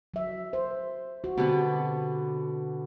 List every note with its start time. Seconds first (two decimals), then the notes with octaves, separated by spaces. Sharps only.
0.14 F#3 E5
0.53 C5
1.24 F#4
1.37 B2 D3 B3 C4 G4